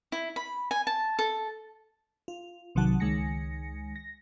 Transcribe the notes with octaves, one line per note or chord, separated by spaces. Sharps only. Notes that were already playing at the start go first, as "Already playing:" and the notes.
E4
B5
G#5
A5
A4
F4
B1 C3 D#3 F#3 F#5 A5
C#2 D#3 G#3 G#5 A#6 C#7
A#6